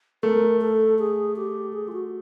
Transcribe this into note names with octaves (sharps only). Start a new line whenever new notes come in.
A3 A#4
A4
G#4
G4
G#4
F4
F#4